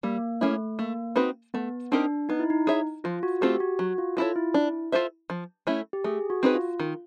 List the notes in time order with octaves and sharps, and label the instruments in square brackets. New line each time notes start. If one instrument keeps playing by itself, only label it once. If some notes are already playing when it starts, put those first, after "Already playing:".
[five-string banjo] G3 [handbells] A#3
[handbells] A3 [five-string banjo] A#3 C#4 E4
[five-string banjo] A3 [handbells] A#3
[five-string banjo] C4 D#4 F#4 B4
[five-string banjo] A3 [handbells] B3
[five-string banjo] C4 D#4 G4 A#4 [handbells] D4
[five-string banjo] B3 [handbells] D#4
[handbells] E4
D#4
[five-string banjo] E4 G#4 C#5 E5
[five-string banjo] F3 [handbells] F4
[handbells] F#4
[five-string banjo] A3 C4 F4 A4 [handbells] G4
[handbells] F#4
[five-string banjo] F#3 [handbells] F#4
[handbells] F4
[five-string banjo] B3 E4 A4 C#5 [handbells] F4
[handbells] E4
[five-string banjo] D4
F4 A4 C5 E5
F3
A3 C#4 E4
[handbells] G4
[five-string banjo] A3 [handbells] G#4
[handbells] F#4
[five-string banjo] C4 D#4 G#4 B4
[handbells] F4
[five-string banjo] D#3